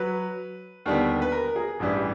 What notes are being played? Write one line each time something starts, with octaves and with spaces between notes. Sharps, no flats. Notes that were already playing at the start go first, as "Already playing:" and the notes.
Already playing: F#3 B4
D#2 D3 G3 B3
B4
A#4
G#4
A1 G2 E3 G3